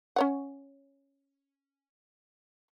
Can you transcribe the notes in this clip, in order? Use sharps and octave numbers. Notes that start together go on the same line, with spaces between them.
C#4 C#5 F#5